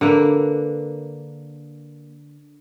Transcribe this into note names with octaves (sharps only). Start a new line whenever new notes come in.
D3 A#3 B4